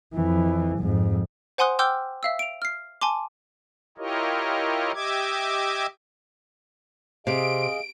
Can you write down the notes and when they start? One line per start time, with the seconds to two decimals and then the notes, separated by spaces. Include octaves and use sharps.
0.14 F2 E3
0.79 F2 G#2
1.58 C5 F#5 G#5 C6 D#6 F#6
1.79 G5 C6 D6 E6 F6 G6
2.23 E5 F5 E6
2.39 D7 F7
2.62 F6 C7
3.01 G#5 A5 C6 D6
3.98 E4 F4 G4 A#4 C#5 D#5
4.94 G4 D#5 E5 D6 G#6
7.27 C3 G#4 D#5 F5 D7